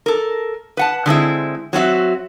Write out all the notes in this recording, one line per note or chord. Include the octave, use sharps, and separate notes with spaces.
A4 A#4
B4 F#5 A5
D3 G#3 C4 E4
F#3 C4 F#4 E5